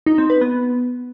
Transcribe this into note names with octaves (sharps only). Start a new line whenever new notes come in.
D#4
C4
B4
B3